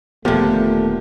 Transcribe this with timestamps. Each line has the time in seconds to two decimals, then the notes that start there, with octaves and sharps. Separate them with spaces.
0.25 D#1 A#2 D3 F3 A3 B3 G4